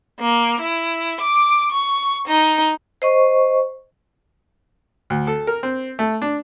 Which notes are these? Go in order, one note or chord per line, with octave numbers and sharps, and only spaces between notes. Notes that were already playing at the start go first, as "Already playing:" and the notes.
A#3
E4
D6
C#6
D#4
C5 D#5 C#6
D2
A4
A#4
C4
A3
D4